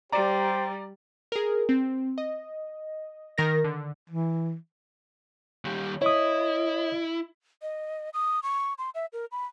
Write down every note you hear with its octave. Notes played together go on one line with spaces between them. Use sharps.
G3 G4 C5 D5 A#5
G#4 A#4
C4
D#5
D#3 A#4 A#6
D3
E3
D#2 G3
E4 C#5 D#5 D#6
D#5
D#6
C#6
C6
E5
A#4
B5